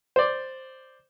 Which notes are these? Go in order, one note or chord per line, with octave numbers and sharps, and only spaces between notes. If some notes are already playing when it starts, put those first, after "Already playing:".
C5 D5